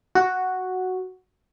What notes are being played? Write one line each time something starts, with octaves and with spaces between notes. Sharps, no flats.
F#4